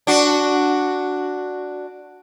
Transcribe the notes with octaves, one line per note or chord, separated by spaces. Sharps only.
D4 F#4